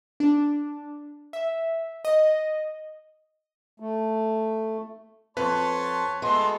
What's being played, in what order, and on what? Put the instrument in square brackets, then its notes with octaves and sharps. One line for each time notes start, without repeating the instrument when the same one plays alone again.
[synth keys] D4
E5
D#5
[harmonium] A3
[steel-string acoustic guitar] F2 [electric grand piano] B4 [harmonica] C#5 A5 C6
[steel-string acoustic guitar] G#3 B3 [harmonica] A3 F#4 A4 [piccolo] C6